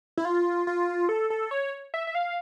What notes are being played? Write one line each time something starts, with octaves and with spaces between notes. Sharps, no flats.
E4
F4
F4
A4
A4
C#5
E5
E5
F5